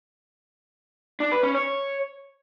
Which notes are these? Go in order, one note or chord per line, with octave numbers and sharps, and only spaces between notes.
D4
B4
C#4
C#5